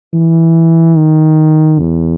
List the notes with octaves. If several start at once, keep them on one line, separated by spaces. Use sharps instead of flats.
E3
D#3
E2